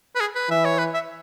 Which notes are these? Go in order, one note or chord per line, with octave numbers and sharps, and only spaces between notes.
B4
G#4
B4
E3 E5
C#5
B4
E5